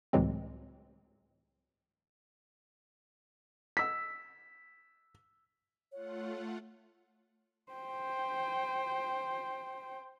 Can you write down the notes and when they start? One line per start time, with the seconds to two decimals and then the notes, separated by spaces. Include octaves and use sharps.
0.13 C#2 A2 E3 F#3 G#3 C4
3.77 E6 B6
5.92 A3 F4 C#5 F#5
7.72 C5 G5